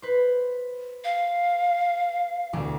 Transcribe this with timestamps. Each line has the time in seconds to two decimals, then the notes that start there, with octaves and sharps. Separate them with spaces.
0.02 B4 C5
1.04 F5
2.53 E1 D2